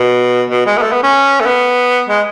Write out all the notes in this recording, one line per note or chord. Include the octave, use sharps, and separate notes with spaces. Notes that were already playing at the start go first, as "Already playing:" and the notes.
Already playing: B2
B2
G#3
B3
A3
B3
C#4
A3
B3
G#3